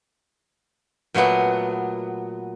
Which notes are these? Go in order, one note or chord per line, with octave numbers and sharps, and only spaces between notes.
A#2 F#3 A3 B3